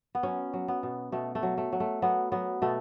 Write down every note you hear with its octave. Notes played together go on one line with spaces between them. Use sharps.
B3
F#3 C#4
F#3
B3
B2
B2 A3
A3
F#3
A3
F#3
A3
F#3 B3
F#3 B3
B2 A3